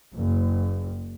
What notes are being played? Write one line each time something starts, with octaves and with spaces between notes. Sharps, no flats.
F#1